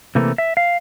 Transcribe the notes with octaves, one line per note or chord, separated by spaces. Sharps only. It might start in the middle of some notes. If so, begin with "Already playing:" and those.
C3 E3 A3 A#3
E5
F5